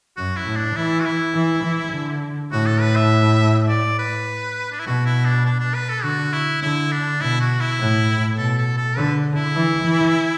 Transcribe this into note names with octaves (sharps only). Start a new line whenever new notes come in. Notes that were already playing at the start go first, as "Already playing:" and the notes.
F#2 F#4
E4
A2
D4
E3 E4
F#4
E4
E3
E3
D3
A2 F#4
A4
B4
E5
D5
B4
D4
E4
B2 F#4
E4
D4
D4
D4
B4
A4
D3 F#4
E4
D3 E4
D4
B2 E4
F#4
E4
A2
B2 A4
A4
A4
D3 B4
E4
E3
E3